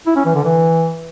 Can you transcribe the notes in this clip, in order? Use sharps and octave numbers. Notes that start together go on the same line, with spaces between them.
E4
C#4
E3
D3
E3